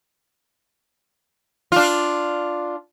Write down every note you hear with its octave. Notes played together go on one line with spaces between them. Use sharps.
D4 F4